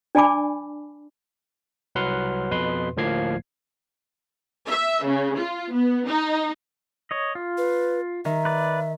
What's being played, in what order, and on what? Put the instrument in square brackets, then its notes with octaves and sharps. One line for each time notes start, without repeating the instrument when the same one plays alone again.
[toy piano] D4 D5 G#5 A5 B5 D6
[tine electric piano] C2 F#3 B4 F#5 C6 F6
F2 B2 B4 C6
D2 A2 F3 A#3 G#6 C7
[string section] E5
C#3
F4
B3
D#4
[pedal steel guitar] C#5 D#5
F4
[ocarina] B4
[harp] D#3 [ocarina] E5
[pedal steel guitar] B4 D5